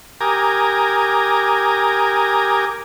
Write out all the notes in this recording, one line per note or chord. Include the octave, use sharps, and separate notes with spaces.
G4 A#4 G#5 A#5 D6 D#6